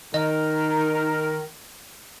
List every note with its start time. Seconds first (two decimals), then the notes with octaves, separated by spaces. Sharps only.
0.14 D#3 D#4 A#4 D#5